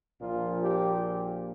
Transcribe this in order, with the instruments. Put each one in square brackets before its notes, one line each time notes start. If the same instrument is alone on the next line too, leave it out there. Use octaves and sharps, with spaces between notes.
[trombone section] A#1 A#2 F3 F4
G4